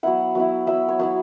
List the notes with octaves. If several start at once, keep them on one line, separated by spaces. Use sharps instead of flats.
F#3 B3 E4 F#5
F#3 B3 E4
F#3 B3 E4 E5
C#5
F#3 B3 E4 F#5